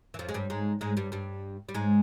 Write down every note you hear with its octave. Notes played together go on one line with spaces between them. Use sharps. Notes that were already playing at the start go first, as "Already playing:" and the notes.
E3
F2 F3
G#3
G2 G3
G#2 G#3
G#2 G#3
G2 G3
G2 G3
G3
G#2 G#3